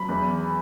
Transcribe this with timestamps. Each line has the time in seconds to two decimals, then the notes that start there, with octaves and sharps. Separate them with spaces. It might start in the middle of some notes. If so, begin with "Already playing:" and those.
Already playing: F#3 B5
0.09 E2